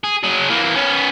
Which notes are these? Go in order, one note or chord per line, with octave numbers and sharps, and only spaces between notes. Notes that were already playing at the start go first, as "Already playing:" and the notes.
G#4
F#3 G#4
E3 A#3
B3 C#4